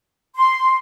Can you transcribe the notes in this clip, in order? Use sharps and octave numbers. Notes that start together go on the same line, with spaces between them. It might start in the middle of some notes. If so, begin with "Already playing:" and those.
C6